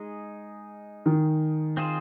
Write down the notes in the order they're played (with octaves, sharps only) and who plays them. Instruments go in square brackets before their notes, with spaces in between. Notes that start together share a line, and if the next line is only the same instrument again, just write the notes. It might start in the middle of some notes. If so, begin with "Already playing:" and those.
Already playing: [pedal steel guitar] G#3 D#4 G#4
[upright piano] D#3
[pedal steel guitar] C4 F4 G#4 C5